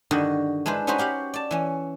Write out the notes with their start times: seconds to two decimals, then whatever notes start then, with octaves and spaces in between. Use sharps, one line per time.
0.11 G2 D3 D#3 F#4 D#5
0.66 G#3 D4 E4 B4 C5
0.87 C#4 D#4 F#4 B4 C5
0.98 F#4 G4 F5 F#5
1.34 D5 A5
1.51 E3 C#4